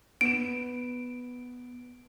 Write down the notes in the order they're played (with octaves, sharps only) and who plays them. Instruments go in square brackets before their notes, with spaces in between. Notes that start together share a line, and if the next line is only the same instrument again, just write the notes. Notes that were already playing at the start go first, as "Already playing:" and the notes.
[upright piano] B3 E7 [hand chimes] D7